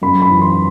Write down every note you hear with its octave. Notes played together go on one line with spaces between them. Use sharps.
F#2 B5
B5
E3
C6